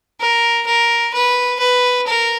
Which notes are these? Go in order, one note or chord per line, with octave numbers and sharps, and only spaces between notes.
A#4
A#4
B4
B4
A#4